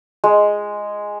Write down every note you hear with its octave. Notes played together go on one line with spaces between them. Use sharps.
G#3